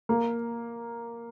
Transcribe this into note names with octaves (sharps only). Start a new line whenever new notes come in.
A#3